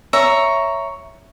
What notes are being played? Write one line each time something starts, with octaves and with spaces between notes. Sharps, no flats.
C#5 E5 A#5